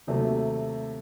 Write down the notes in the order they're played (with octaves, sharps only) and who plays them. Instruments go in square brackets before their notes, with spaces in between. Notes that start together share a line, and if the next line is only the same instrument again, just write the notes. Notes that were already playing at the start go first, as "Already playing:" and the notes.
[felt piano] D#2 C3 F#3 A3